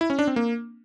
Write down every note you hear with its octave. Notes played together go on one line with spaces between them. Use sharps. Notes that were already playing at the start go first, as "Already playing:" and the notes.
E4
C#4
D4
C4
A#3